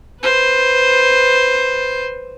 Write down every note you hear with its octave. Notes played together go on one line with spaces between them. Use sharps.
B4 C5